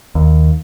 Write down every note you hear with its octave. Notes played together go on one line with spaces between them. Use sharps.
D#2